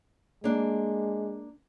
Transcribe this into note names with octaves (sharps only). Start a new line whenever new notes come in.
G#3 A#3 D4